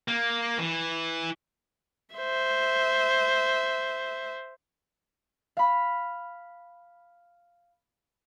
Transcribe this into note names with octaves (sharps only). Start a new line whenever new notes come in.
A#3
E3
C5 E5
F5 B5